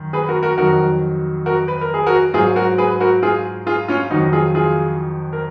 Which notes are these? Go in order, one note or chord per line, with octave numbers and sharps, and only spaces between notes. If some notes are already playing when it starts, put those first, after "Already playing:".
Already playing: F#2 D#3
G#4 B4
F#4 A#4
F#4 A#4
F2 D#3 F#3 F#4 A#4
F#4 A#4
B4
A#4
G#4
F#4 A#4
G#2 F#3 F4 G#4
F#4 A#4
G#4 B4
F#4 A#4
F4 G#4
F4 G#4
C#4 F4
F2 D#3 F#3 D#4 F#4
F4 G#4
F4 G#4
A#4